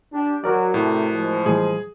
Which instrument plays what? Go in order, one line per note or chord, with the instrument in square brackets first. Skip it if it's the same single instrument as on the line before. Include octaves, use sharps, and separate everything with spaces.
[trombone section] D4 G4
[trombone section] F#3 [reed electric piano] F#4 A#4 D5
[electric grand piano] A2 [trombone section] C3 A3
[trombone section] F3 G#3
[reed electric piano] A2 E3 G3 [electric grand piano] G#4